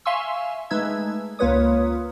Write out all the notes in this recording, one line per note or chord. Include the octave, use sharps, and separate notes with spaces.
E5 F5 G#5 C6 C#6 E6
G#3 A3 D#4 B4 E6 G#6
C#2 A#3 F4 B4 C#5 D#6